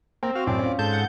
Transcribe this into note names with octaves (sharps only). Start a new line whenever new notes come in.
A#3 C4 G5
F#4 F5
F#2 A2 D5
C#4 F4
G#2 A4 A5 G6
F#5